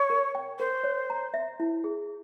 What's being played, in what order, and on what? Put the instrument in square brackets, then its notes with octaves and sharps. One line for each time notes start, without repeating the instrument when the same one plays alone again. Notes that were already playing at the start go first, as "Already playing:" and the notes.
Already playing: [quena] C#5
[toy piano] A#4
G5
[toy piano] A#4 [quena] C5
[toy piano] C#5
A#5
E5
E4
G#4